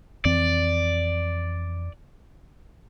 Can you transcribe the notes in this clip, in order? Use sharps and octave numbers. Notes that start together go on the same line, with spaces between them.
F2 E3 C4 D5